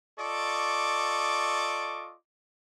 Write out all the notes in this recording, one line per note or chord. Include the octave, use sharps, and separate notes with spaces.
F4 A4 D5 D#5 C#6 D6